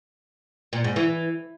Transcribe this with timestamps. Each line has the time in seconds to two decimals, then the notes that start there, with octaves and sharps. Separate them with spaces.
0.73 A#2
0.84 G#2
0.96 E3